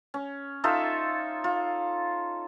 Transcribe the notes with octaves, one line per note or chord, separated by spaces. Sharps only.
C#4
D#4 F4 A4 E5
F4